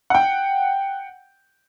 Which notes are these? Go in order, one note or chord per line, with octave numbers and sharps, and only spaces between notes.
F#5 G5